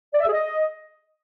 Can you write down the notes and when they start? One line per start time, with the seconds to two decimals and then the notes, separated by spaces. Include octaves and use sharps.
0.14 D5
0.20 E5
0.26 G#4
0.32 D#5